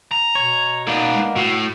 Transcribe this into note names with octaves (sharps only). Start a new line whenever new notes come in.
A#5
B2 C#5
A#3 B3 D#4 D5
G#3
A2 F#4